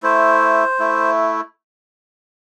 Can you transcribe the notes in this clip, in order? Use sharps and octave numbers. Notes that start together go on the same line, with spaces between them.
A3 E4 C5
A3 E4